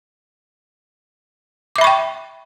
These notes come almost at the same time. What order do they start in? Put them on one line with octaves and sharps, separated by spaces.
D6 E5 B5 C#6 G5